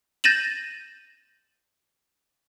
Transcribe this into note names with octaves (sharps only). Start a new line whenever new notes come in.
G6 A6 A#6 D#7 E7 F#7